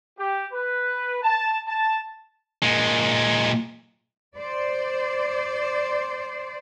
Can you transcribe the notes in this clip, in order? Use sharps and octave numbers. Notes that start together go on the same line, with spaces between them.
G4
B4
A5
A5
A#2 G#3
C5 D5